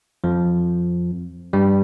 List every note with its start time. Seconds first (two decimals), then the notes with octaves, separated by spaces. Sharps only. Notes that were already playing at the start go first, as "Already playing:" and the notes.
0.24 F2 F3
1.53 G2 G3